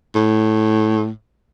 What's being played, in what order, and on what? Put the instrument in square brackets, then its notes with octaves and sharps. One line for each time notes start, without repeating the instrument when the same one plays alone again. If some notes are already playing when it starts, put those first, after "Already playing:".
[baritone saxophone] A2